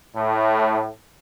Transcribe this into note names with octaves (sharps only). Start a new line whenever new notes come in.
A2